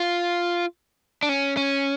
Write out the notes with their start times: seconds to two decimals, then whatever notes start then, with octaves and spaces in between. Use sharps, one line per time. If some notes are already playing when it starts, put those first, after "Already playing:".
Already playing: F4
1.23 D4
1.29 C#4
1.57 C#4